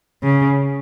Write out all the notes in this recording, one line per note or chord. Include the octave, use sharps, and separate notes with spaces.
C#3